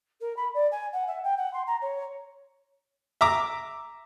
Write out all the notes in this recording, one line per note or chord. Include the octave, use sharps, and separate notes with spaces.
A#4
B5
D5
G#5
F#5
E5
G5
F#5
C6
A#5
C#5
E5 A#5 D6